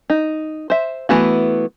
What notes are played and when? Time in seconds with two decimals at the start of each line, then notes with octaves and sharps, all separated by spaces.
0.10 D#4
0.70 C5 E5
1.09 E3 A3 B3 F#4